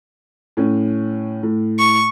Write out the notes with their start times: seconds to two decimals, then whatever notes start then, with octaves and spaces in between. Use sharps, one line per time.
0.57 A2 C#4
1.43 A2
1.79 C#6